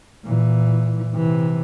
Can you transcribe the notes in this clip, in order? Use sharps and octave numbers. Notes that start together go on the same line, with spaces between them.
A#2 E3
C3 E3